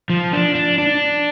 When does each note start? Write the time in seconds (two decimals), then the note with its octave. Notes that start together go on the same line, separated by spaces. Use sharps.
0.10 F3
0.33 D4
0.55 D4
0.78 D4